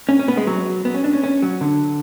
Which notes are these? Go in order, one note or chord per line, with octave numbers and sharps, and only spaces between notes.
C#4
C#4
B3
G#3
F#3
B3
C#4
D4
C#4
C#4
F#3
D3